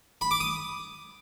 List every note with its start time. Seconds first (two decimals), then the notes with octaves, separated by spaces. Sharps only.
0.21 B5
0.31 D6
0.40 D#6